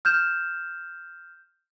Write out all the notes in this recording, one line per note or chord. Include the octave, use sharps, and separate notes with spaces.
F6 G6 E7